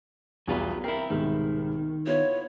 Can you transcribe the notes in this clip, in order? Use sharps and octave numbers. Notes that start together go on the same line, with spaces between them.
B1 E2 F#3 G3 F4 B4
C4 E4 A#4 C7
C2 G#2 B2 D#3
B3 E4 F4 C#5